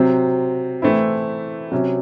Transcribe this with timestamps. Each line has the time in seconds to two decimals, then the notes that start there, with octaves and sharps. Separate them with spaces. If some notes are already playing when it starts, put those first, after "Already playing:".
Already playing: C3 F#3 C4
0.82 E3 A3 C4 E4
1.72 C3 F#3 C#4